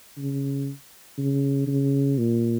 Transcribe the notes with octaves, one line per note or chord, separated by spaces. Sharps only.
C#3
C#3
C#3
A#2